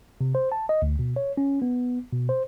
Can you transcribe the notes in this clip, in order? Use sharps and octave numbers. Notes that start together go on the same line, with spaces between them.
C3
C5
A5
D#5
D2
B2
C#5
C#4
B3
B2
C5